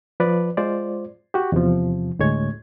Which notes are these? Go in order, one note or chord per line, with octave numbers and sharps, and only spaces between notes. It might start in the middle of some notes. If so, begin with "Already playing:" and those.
F3 B4 D5
G#3 F4 C5 D5
F#4 G4
E2 C3 F3
D2 A2 G#3 C#5 G#6